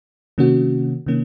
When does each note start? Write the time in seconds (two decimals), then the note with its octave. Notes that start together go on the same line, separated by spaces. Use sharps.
0.38 C3 D#3 A#3 C#4 F#4
1.06 C3 D#3 A#3 C#4